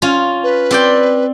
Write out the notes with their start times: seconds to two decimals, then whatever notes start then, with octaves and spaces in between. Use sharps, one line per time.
0.02 C#4 F4
0.43 B4
0.71 C4 D5 G5